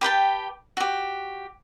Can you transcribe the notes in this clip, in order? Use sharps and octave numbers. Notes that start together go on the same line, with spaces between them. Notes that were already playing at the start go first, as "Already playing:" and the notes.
G4 B4 G5 A5
F#4 G4